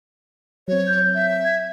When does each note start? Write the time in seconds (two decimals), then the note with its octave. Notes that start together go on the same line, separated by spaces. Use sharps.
0.68 F#3 C4 C#5
0.87 G6
1.15 E5
1.45 G#6